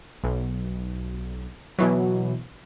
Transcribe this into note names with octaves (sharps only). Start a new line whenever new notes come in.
B1
B2 E3 F#3